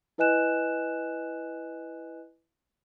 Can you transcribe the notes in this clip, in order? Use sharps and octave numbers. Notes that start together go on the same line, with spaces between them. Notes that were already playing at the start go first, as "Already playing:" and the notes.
E4 B4 D#5 G#5 F#6 E7